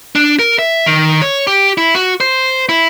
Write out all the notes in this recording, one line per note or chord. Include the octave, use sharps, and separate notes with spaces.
D4
A#4
E5
D#3
C#5
G4
E4
F#4
C5
E4